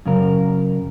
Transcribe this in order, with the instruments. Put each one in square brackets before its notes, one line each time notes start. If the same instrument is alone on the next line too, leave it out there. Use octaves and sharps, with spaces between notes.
[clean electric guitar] F#2 C#3 A#4